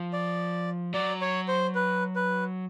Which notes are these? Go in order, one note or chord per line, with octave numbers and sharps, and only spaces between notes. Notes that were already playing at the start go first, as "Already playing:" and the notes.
Already playing: F3
D5
F#3 D5
C#5
C5
B4
B4